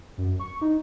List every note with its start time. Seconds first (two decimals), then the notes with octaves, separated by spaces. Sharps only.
0.18 F#2
0.40 C#6
0.61 D#4